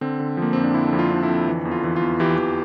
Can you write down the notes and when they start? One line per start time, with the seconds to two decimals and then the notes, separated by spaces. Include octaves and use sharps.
0.01 D3 C4
0.20 D3
0.37 F3 A#3
0.53 F2 C4
0.64 D4
0.74 D3 E4
0.93 F2
0.99 F4
1.10 D3 D4
1.23 E4
1.29 F2
1.48 E3
1.65 E2
1.71 F4
1.84 E3
1.96 F4
2.02 E2
2.20 E3 G4
2.38 E3